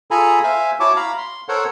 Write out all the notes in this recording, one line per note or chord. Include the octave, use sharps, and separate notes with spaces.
F4 G#4 A4 G#5 A#5 B5
C5 E5 F5 G#5
E4 F#4 C#5 A5 D6
F5 A#5 B5
C6
A4 A#4 C5 C#5 F#5